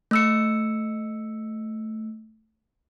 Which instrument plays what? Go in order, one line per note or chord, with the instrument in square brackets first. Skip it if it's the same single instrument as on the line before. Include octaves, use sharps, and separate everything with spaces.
[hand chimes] A3 E6 C#7